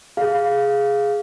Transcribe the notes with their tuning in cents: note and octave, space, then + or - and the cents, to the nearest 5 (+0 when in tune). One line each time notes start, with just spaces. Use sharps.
G#4 +0 F5 +0